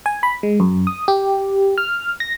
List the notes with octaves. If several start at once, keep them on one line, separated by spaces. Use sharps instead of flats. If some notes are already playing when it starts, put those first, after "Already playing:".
G#5
B5
G#3
F#2
D#6
G4
F6
A#6